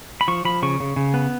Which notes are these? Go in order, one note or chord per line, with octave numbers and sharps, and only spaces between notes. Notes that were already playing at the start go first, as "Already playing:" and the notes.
B5
F3 C#6
F3 B5
C#3 C#6
C#3
C#3
B3